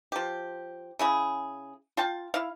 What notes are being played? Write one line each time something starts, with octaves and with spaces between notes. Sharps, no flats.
F3 G4
C#3 E4 G#4
F4 G5 A5
E4 F5